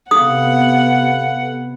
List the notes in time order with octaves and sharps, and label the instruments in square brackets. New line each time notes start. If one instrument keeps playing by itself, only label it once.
[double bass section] C3 B3 [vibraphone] A4 F5 [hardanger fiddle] F#5 [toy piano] D#6